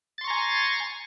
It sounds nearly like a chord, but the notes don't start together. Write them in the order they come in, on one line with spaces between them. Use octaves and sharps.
A6 C6 C#6 A#5 G#5